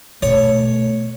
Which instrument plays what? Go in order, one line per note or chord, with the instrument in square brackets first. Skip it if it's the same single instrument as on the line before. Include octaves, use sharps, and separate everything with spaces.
[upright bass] B2 [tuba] A3 [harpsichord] C#5